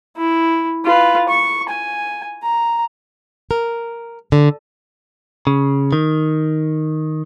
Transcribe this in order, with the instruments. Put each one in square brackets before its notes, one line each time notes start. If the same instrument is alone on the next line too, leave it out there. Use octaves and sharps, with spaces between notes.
[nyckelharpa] E4
F4 B4
C#6
G#5
A#5
[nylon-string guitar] A#4
D3
[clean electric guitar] C#3
D#3